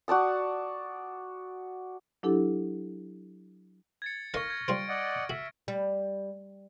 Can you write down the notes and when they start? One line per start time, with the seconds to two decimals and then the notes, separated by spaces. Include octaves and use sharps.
0.08 F#4 D5 A5 D#6
2.23 F#3 D4 E4 G4 A4
4.02 G#6 A6 C#7
4.34 D#4 A#4 F5 C#6 F6 A#6
4.50 G#6
4.68 G3 F4 C5 D7
4.89 D5 D#5 F#5
5.30 F#4 E5
5.68 G3